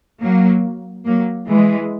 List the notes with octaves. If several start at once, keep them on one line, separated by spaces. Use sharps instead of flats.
F#3 A#3
F#3 A#3
E3 G#3